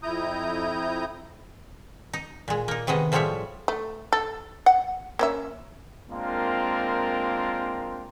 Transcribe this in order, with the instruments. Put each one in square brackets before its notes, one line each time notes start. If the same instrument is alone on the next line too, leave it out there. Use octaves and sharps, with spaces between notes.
[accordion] F2 E4 A#5 D#6 G6
[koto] D#4
A#2 G#3
A#3 D#4
C3 D#3 G#3 B3 D#5
A2 F3 G3 G#3 C#5 E5
[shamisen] A3
A4
F#5
A#3 C#4 E5
[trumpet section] G#3 A#3 C4 D4 F4 A#4